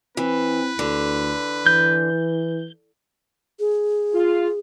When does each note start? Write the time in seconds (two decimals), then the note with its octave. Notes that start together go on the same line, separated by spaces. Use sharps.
0.17 E3 C4 B4
0.79 D2 D3
1.66 E3 G6
3.60 G#4
4.13 F4